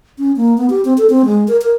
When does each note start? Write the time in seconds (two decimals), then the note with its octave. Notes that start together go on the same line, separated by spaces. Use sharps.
0.19 C#4
0.37 A#3
0.58 B3
0.70 G4
0.85 C4
0.98 A4
1.10 C4
1.25 G#3
1.48 A#4
1.62 A#4